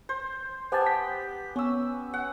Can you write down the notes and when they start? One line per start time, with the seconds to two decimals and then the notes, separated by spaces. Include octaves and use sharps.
0.09 C5
0.72 B3 G4 C5 G#5 A5
0.86 G5 B6
1.56 B3 C#4 E6
2.14 F#5